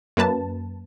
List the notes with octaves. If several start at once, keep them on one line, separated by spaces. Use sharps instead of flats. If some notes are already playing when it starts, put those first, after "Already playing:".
F#2 A#3 B4 A5